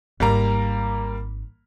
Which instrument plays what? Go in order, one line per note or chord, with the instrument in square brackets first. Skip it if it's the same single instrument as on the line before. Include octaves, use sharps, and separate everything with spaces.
[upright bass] G#1 [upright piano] G3 A#3 A#5